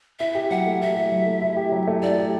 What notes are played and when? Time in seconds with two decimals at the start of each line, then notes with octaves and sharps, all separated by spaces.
0.19 E4 E5
0.35 G4
0.50 F#3 F#5
0.66 A3
0.81 E4 E5
0.96 G4
1.12 F#3
1.27 A3
1.42 E4
1.57 G4
1.72 F#3
1.88 A3
2.02 E4 D5
2.18 G4